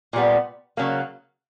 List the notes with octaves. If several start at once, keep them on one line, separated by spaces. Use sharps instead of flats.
A#2 G3 B3
C#3 F#3 A#3